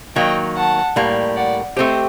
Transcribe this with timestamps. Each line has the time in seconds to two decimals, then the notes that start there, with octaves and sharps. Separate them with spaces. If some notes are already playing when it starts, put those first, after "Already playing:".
0.15 D#3 F#3 A#3 D#5 G5
0.56 F#5 A5
0.96 A2 G3 A#3
1.36 D5 F#5
1.76 A3 C4 G4 C5 D#5